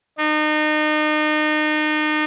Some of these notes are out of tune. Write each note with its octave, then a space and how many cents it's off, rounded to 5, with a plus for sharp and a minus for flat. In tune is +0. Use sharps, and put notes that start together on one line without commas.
D#4 -35